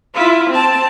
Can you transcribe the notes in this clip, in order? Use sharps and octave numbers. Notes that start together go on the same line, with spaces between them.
E4 F4
C4 A5